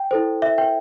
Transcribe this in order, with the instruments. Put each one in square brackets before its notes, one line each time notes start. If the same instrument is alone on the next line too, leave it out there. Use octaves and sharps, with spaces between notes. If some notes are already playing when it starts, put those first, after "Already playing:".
Already playing: [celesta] G5
E4 A4 C5
E5
G5